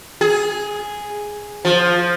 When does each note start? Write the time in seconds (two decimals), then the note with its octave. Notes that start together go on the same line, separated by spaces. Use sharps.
0.21 G#4
1.65 F3